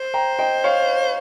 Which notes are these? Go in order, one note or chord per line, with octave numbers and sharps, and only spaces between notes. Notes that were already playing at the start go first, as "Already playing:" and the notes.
Already playing: C5
G5 A#5
D#5 G5
C#5 F5